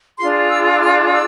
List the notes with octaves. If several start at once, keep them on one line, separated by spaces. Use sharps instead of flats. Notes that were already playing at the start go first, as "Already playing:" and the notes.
D4 F4 G#4 C6
E6
E6
F6
E6